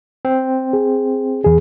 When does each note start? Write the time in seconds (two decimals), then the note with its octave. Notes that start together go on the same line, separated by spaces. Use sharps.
0.25 C4
0.73 G#4
1.44 E2 G#4